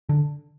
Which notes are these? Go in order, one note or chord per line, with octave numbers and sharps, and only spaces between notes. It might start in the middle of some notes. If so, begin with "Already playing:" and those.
D3